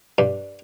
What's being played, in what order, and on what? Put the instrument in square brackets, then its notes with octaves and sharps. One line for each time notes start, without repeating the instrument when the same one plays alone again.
[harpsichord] G2